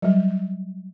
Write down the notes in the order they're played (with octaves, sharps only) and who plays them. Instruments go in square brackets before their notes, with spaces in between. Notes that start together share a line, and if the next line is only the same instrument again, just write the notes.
[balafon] F#3 G3